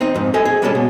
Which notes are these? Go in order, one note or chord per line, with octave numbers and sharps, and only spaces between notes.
C4 D#4
F2 G#2
A4 D#5 G#5
G#4
G3 G#3 C#4 G#4 A4
B2